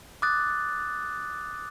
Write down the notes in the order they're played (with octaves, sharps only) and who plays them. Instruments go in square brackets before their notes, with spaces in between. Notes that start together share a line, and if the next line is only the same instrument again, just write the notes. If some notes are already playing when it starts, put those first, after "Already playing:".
[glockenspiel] D6 D#6 F#6 A6